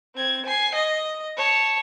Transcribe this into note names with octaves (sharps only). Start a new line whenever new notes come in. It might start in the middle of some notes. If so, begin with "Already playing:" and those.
C4 G#6
G#5 C7
D#5
C#5 A5